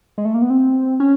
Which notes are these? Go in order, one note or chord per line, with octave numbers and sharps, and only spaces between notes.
G#3
A3
A#3
B3
C4
C#4